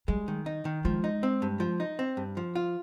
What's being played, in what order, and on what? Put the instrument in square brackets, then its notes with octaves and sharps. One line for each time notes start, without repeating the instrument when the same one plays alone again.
[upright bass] G3 [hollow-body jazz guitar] G#3
[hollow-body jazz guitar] D#3
D#4
D#3
[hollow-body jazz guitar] F3 [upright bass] G#3
[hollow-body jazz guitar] D#4
C4
G2
F3
D#4
C4
G2
F3
F4